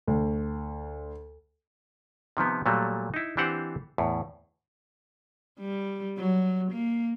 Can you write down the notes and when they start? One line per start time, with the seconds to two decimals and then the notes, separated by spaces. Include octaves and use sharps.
0.07 D2
2.37 C3 D#3 F3 B3
2.66 A#2 F#3 G3 A3 A#3
3.14 D#4 E4
3.37 E3 C4 D4 G4 C5 F#5
3.98 E2 A2
5.60 G3
6.18 F#3
6.72 A#3